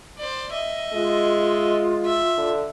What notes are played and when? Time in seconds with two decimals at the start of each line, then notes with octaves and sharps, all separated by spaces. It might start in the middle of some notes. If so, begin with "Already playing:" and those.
0.18 C5 D5
0.52 D#5 E5
0.93 G#3 F4
2.05 E5
2.37 D3